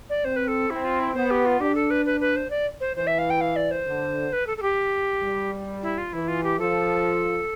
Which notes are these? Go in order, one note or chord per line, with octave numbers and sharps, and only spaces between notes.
D5
C4 C5
B4
A4
C4 E4
F4
E4
B3 C5
G4
F4
D4 G4
A4
B4
B4
B4
C5
D5
C5
E3 C5
E5
F5
G5
F5
D5
C5
D3
B4
A4
A4
G4
G3
E4
F4
E3 E4
F4
G4
F3 A4